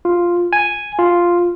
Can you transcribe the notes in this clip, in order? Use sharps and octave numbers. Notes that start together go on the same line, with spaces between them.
F4
G#5
F4